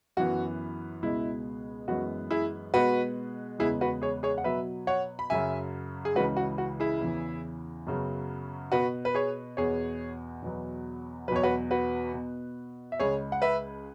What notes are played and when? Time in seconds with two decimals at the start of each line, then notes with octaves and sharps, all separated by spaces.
0.17 F#2 E3 B3 F#4
1.03 C#2 B2 G#3 B3 E4
1.88 F#2 E3 G#3 B3 F#4
2.31 E4 G#4
2.74 B2 G#3 B3 F#4 B4
3.59 E2 C#3 G#3 B3 E4 G#4
3.81 F#4 B4
4.02 G#4 C#5
4.23 G#4 C#5
4.38 F#5
4.44 B2 F#3 B3 B4 E5
4.87 C#5 F#5
5.19 B5
5.30 F#2 C#3 F#3 E5 G#5
6.05 G#4
6.15 C#2 C#3 E3 G#3 F#4 B4
6.37 F#4
6.58 F#4
6.80 E4 G#4
7.01 E2 C#3 E3
7.87 F#2 C#3 F#3 B3
8.72 B2 B3 F#4 B4
9.05 B4
9.15 G#4 C#5
9.57 E2 B2 B3 G#4 C#5
10.42 E2 B2 F#3 B3
11.28 F#3 B4
11.31 E2 B2 C#5
11.43 F#4 B4
11.71 F#4 B4
12.13 B2 B3
12.92 E5
13.00 C#2 C#3 G#3 G#4 C#5
13.32 F#5
13.42 B4 E5